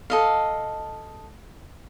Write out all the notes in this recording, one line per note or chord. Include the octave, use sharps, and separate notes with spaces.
A4 D#5 F5